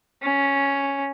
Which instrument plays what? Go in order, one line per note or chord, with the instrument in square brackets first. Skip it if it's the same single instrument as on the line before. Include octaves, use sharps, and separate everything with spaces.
[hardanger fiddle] C#4